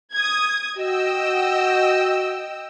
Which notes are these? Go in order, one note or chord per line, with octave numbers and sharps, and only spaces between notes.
D#6 G#6
F#4 D#5 G5 E6